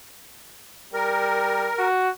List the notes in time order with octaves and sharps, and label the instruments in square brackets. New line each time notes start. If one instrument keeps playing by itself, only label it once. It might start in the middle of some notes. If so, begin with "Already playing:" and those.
[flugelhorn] G3 [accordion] A#4
[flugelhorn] F#4